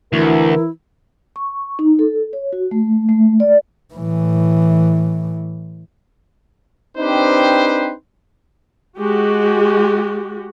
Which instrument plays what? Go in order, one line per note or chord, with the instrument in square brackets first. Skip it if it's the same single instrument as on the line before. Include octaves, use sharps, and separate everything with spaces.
[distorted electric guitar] D2 [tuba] E3 [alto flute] E4 [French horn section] A#4
[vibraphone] C#6
D#4
A4
C#5
F#4
A3
A3
D5
[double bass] A2 E3
[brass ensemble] C4 D4 D#4 G4 B4 C5
[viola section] G#3 F#4 G4